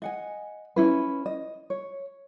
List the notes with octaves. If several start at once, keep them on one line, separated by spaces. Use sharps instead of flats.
D#5 F#5 G#5
C#4 E4 B4
D#5
C#5